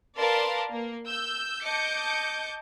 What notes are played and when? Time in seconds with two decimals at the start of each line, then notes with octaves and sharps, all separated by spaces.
0.17 A#4 B4 D5 F5 A5 C6
0.71 A#3
1.05 E6 G6
1.63 D#5 A5 D6 G6 C#7